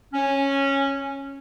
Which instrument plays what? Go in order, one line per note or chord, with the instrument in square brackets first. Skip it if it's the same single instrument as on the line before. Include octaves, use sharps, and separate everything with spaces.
[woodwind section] C#4